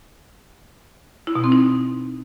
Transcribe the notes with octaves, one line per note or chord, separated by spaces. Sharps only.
E4
B2
C4
D#4